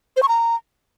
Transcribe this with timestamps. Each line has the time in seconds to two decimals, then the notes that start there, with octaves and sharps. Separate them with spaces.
0.17 C5
0.23 C#6
0.28 A#5